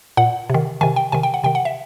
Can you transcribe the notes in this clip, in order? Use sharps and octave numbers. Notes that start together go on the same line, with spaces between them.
A#2 F#5
C3 D#3
C3 D#3 G#5
G5
C3 D#3 G#5
G5
F#5
C3 D#3 G5
F#5
E5